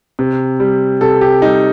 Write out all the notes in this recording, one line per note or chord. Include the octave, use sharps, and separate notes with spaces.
C3
G3
C3 A4
G4
G3 D#4